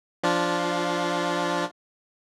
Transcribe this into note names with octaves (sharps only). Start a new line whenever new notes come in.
F3 D4 F4